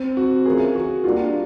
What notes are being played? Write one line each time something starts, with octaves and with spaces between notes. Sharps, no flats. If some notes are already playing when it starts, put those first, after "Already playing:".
Already playing: C4
F#4
E3 A3 C#4 F4 G#4 A#4
F#4
G3 A#3 D4 F4 F#4